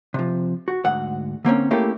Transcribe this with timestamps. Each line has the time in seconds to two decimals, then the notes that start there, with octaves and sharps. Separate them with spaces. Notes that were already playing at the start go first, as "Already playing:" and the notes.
0.14 C3 F3
0.68 F#4
0.84 D2 G#2 F#5
1.45 D3 A#3 C4 C#4
1.71 A3 A#3 C#4 E4 G4